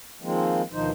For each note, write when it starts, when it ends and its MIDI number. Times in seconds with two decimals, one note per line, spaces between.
0.22 0.62 51
0.22 0.62 53
0.22 0.62 56
0.22 0.62 58
0.22 0.62 60
0.72 0.91 38
0.72 0.91 47
0.72 0.91 51
0.72 0.91 53
0.72 0.91 63
0.72 0.91 72